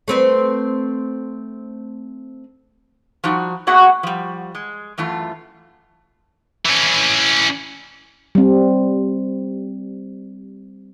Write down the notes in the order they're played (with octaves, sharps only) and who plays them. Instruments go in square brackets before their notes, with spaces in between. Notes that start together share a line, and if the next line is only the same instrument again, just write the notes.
[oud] A3 C4 B4
[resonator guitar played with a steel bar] F3 G3 D#4 F#4
A#3 B3 F#4 G#4 E5 F#5
F3 G3
G#3
F#2 E3 A3 F4
[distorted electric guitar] E3 C#4
[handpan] G3 C4